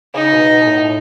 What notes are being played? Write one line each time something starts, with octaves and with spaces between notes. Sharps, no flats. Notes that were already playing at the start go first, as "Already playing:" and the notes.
C#3 D#4
B2
B2
A2